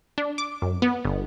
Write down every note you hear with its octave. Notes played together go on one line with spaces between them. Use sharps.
D4
D6
F#2
B3
G1